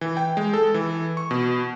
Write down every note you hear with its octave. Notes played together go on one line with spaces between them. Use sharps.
E3
G5
G#3
A4
E3
C#6
B2